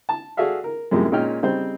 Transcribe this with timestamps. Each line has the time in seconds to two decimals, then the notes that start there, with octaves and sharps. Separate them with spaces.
0.09 A5
0.37 F#4 G#4 A4 D5 E5 F5
0.64 A#4
0.91 F#2 A2 C3 F3 G#3 A#3
1.12 A#2 G#3 C#4 D#4 G5 F6
1.42 C#3 G3 C4 D#4 C5